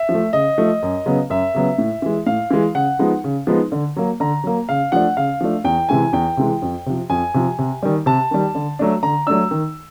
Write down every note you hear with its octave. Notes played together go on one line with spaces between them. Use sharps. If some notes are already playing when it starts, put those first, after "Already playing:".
Already playing: E5
F3
A3
C#3 D#5
F3 A3
F#2
C#3 F#3 B3
F#2 E5
C#3 F#3 B3
A2
E3 G#3
A2 F5
E3 G#3
C#3 F#5
F3 G#3 B3 D#4
C#3
F3 G#3 B3 D#4
D3
F#3 A#3
D3 A#5
F#3 A#3
C#3 F5
F3 A3 D4 F#5
C#3 F5
F3 A3 D4
E2 G5
C3 E3 G#3 G#5
E2 G5
C3 E3 G#3
F2
C3 F3
F2 G#5
C3 F3
C3
D#3 G3
C3 A5
D#3 G3
D3
F#3 A3 D4
D3 A#5
F#3 A3 D4 E6
D#3